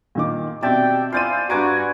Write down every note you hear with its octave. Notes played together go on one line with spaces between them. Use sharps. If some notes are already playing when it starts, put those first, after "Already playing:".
A#2 D#3 D6
B2 C4 G4 D5 E5 G5 A5
E4 F4 C5 D5 G#5 E6 A6 D#7
G2 F#4 B4 G#5 A#5 D6